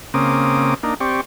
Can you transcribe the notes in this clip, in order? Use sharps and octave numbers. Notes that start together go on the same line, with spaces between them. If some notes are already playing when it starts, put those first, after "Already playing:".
C#3 A#3 C4 D6 D#6
A#3 D4 D#4
C4 G4 D5 C#6